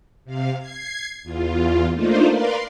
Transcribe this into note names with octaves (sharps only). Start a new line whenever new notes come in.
C3 F5
G#6 C7
E2 F4
A3 A#3 D4 D#4 F4 C5
A#4 B4 D5 F5 C6